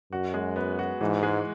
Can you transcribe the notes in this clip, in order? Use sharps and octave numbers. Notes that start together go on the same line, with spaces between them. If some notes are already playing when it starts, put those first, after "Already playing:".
F#2 F#4
G#3
B3
F#4
G#2 E3
G#3